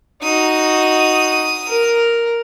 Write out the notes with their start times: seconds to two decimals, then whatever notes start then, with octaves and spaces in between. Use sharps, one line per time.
0.23 D#4 F#4 D#6
1.68 A#4